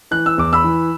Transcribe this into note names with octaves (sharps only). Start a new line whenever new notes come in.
E3 F#6
E6
E2 D6
B5 E6
E3